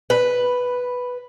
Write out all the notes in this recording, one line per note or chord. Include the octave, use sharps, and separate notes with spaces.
B4